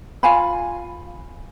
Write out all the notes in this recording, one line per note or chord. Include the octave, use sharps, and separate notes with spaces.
F4 F5 G#5 B5